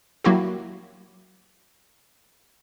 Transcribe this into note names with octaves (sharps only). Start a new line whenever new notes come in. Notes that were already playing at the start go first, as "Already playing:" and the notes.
F#3 A#3 E4 F#4 G4